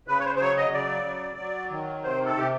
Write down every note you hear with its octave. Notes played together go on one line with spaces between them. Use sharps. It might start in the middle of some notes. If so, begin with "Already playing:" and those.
C#3 B4
C#5
C5
C5
F#3 C#5
D#5
C#3 D5
F#3
F#3
D#3
C3 C5
A4
C3 G4